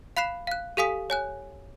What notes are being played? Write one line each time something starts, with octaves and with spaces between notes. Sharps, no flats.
F5 B5 F#6 C7 E7
F5 F#6
G4 A4 F5 G#5 D#6 B6
C#5 G#5 F#6